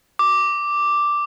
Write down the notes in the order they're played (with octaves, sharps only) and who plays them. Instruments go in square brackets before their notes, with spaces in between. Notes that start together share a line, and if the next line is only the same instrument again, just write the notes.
[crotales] D6